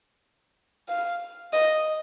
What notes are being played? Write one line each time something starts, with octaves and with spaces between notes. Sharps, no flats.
F5
D#5